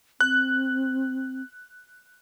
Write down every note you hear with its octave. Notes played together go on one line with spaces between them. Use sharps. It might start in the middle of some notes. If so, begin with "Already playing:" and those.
C4 F#6